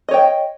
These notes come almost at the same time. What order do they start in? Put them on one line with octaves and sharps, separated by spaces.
D#5 C#5 G5